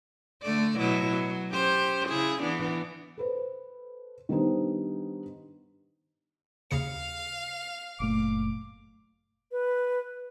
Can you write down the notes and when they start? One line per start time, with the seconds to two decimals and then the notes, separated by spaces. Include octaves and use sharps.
0.43 D3 A3 D5
0.78 B2 F#3 E4
1.11 F#3
1.50 C#4 G4 C5
2.09 C#3 E4 G#4
2.42 E3 B3 D4
3.17 A4 B4 C5
4.29 D#3 G3 B3 D4 D#4 C5
6.71 D#2 C#3 F5 C#7
8.00 F#1 A#2 A3 D6
9.52 B4